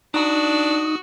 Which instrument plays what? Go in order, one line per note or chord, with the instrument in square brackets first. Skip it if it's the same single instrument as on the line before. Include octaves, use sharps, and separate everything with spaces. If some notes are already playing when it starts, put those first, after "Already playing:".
[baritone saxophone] D4 [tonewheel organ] D#4 D#6 [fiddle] F#4